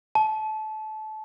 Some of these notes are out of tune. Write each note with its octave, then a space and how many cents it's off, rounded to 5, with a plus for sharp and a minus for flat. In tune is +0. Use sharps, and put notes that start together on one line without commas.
A5 -25